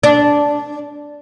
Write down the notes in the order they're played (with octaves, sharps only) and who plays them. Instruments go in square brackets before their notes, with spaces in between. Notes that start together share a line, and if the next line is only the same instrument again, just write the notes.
[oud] D4